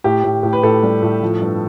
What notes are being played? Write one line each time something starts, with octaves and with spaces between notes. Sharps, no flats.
A2 G4
A2
A2
B4
A2 A4
G3
A2
F3
G2